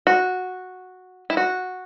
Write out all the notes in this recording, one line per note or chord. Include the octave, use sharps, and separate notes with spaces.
F#4
E4
F#4